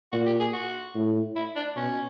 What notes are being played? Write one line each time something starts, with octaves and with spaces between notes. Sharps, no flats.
A#2 F#4
G4
G#4
F#4
A2
E4
D4
B2 C#4